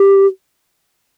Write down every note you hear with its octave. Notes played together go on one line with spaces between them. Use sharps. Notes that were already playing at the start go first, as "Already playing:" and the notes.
Already playing: G4